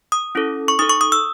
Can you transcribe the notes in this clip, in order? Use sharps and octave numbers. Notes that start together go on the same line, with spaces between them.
D#6
C#4 E4 A4
C#6
D#4 A4 D#6
C#6
D#6
E6